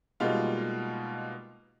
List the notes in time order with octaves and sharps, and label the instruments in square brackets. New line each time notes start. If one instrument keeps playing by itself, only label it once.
[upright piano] B2 G3 G#3 A#3 D#4 F4